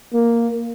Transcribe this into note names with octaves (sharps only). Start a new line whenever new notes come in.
A#3